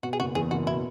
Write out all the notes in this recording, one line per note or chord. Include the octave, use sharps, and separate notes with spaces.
B2 F#4
G#4
F#1 F#4
E2 G#4
F#1 F#4
B2 E4